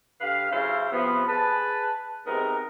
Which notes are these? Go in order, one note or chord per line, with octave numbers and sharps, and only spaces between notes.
D3 G4 B4 F5
C#3 F#3 E4 C5 E5 F5
C3 F3 B3
G#4 B4 A5
G#2 C3 G#3 B3 A#4